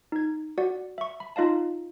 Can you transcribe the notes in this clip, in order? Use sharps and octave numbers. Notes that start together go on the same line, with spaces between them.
D#4 G#6
F#4 D5 F#5
E5 C#6
B5
D#4 F4 D#5 F5 A5